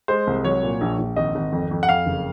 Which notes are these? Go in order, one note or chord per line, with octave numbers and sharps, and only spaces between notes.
G#3 C5
C2
F#3 C#5
A#2
A#1
A#1
G#1 D#5
G#1
F2
F2
F#5
F2 F5
F#1